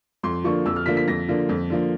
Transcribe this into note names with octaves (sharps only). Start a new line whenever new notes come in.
F2 C6
D3 F3 A#3 C#6
F2 E6
F6
D3 F3 A#3 B6
B6
F2 A#6
D3 F3 A#3
F2
D3 F3 A#3